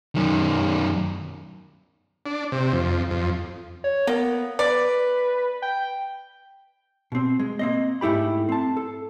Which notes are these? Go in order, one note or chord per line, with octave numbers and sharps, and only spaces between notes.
F#2 D#3
D4
C3
F2
F2
C#5
A#3 B3
B4 D5
G5
B2 C4
G#3
A#3 C4 D#5
G#2 A3 E4 G4 B5
C4 A5
A4